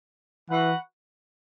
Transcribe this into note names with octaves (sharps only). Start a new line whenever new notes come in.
E3 F#4 B4 F#5